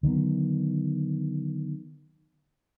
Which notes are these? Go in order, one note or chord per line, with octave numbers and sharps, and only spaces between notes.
D3 D#3 F#3 B3